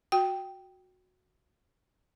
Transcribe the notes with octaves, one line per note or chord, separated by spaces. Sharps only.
F#4 G5